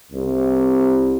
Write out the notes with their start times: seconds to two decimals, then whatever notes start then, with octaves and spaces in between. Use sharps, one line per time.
0.12 C2